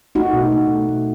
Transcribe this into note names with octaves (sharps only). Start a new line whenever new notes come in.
A3 D#4 F#4
B2
A3
B2
A3